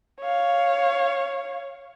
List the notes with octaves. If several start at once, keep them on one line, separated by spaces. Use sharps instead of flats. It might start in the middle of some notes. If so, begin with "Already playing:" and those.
C#5 F5